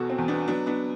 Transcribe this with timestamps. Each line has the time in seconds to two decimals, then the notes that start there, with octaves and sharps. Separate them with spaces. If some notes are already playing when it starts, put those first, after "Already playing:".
Already playing: E2 B2 F#4 A4
0.10 C4
0.18 E2
0.28 B3 D4
0.47 F#3 B3 D4
0.66 B3 D4